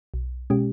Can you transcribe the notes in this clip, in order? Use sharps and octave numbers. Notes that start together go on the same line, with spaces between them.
B1
B2 G#3 C#4 G4